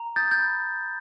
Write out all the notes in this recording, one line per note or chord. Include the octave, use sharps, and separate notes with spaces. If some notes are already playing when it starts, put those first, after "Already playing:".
Already playing: A#5
D#6 G6 A6
G6 A6
B5